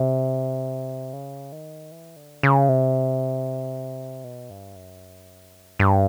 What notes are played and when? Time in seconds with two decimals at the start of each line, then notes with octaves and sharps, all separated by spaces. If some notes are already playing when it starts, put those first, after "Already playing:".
Already playing: C3
1.13 C#3
1.52 D#3
1.92 E3
2.16 D3
2.43 C#3
2.69 C3
4.24 B2
4.50 G2
4.76 F#2
5.79 G2